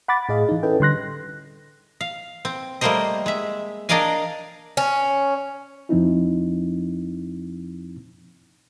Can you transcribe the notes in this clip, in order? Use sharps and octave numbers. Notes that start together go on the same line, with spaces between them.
F#5 B5 D6 A6
A2 G#4 D#5 F5
E3 D#4
C#4 E4 A4 B4 D#5 G5
D3 G3 C6 F#6 A#6
F5
C4
G3 A3 A#3 A#4 C5 D#5
G#3 E5
D4 A#4 D5 D#5 F5 G#5
C#4
F2 F3 C4 D#4 E4